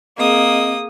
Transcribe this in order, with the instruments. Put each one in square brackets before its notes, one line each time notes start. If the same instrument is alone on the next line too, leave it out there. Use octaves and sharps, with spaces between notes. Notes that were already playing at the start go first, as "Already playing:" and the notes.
[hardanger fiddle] A#3 [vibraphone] C4 D#5 [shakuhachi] G#4 [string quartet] D#6